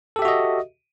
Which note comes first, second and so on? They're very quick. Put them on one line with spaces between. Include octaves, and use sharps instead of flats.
A4 G4 E5 F#4 D#5